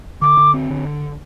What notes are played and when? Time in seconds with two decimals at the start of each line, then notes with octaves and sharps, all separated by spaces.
0.21 D3 D6
0.38 D3
0.54 C4
0.70 D3